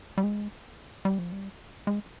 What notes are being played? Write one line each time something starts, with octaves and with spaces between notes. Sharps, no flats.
G3
G#3
G3
F3
G3
G#3